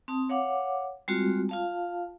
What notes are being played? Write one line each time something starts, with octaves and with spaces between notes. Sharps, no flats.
C4 A5 D#6
C#5 F5 F#5 D6
G3 G#3 C4 F4 F#4
F4 F5 A5